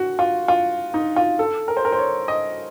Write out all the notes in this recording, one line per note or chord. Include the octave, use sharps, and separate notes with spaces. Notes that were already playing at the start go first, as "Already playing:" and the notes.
Already playing: F#4
F4
F4
D#4
F4
A4
A#4
C5
A#4
C5
C#5
D#5